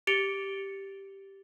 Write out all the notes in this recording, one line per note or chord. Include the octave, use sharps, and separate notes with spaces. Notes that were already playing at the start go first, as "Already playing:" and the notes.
G4 A6 C#7 D7 F7 G7